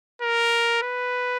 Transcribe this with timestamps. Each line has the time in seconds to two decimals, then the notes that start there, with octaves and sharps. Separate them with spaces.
0.22 A#4
0.83 B4